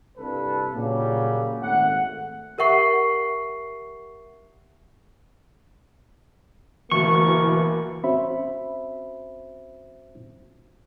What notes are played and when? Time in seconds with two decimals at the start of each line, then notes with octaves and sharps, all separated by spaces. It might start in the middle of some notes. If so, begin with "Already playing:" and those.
0.17 C2 G2 A4 B4
0.75 A#2 C#3 F#3 G3
1.63 G#1 A3 F#5
2.58 G4 A#4 E5 F#5 C#6 C7
6.91 D2 B2 E3 A#3 C#6
8.04 C4 C#4 F#4 C5 E5 B5